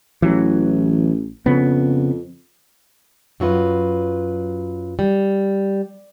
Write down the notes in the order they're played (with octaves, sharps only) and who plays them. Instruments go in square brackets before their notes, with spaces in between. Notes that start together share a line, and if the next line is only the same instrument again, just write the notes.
[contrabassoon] A1 [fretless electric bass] E3 F#3
[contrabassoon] F2 [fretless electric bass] C#3 B3
[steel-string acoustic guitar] F#2 F#3 F4 B4
G3